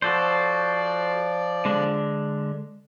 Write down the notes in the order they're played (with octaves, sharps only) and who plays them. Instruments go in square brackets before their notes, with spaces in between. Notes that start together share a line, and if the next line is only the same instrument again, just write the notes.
[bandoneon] F3 D5 [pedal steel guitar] F#4 A4 C5
[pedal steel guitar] D3 G#3 D4